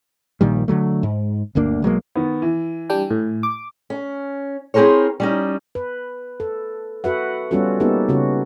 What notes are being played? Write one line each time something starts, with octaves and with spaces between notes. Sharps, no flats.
A#1 A#2 D#3 G3
D3 D#3 F#3 A3
G#2
G1 D2 A#3 D4
B1 F#3 G#3 A#3
D#3 B3
E3
G3 D4 G5
A2
D6
C#4
C4 E4 G#4 A#4 C5 C#5
G3 C#4 D#4
B4
A4
F#4 A4 B4 E5 F#5
G3 B3 C#4 F4 F#4 A4
A#3 B3 D#4 G4 A4
C#3 C#4 F#4